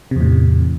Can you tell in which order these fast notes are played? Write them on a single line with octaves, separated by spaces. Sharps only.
C3 E2 A2